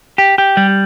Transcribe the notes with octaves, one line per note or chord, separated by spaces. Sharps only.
G4
G4
G3